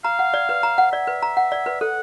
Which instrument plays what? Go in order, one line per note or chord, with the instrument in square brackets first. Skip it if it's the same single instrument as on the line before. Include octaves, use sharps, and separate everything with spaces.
[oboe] F5 [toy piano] A#5
[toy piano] F#5
D5
B4
A#5
F#5
[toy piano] D5 [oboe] E5
[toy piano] B4
A#5
F#5
D5
B4
[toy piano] A4 [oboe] F#5